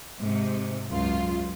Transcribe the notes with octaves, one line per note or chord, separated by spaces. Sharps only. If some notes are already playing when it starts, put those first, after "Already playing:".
G#2 C3
C#2 F#2 F4